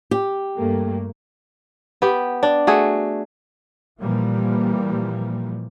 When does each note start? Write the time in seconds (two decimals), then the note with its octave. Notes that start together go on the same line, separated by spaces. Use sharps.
0.11 G4
0.57 G2 A3 A#3
2.02 B3 G4
2.43 D4
2.67 A3 F#4 G#4
4.00 A#2 E3 F3 G3 A#3